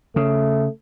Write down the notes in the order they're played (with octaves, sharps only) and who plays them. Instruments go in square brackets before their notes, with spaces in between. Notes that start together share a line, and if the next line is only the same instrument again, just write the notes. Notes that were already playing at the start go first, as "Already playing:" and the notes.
[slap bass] C#3 [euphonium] A3